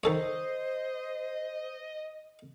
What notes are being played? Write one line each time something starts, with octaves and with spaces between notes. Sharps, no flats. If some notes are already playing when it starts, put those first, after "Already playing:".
D#3 A4 C5 C#5 D#5